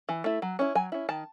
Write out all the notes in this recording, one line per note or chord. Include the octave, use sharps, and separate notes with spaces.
E3
A3 E4
F#3
C#4 E4
F#3 G#5
C#4 E4
D#3 A5